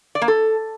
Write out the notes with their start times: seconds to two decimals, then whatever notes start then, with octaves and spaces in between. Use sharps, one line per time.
0.15 D5
0.22 A#3
0.28 A4